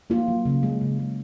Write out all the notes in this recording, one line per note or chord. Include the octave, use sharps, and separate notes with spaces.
A#3 F4
F#3
C#3
G#3
C#3
G#3